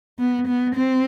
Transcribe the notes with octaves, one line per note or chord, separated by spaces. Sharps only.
B3
B3
C4